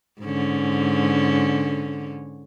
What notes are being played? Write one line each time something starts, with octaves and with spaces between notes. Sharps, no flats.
G#2 D3 C#4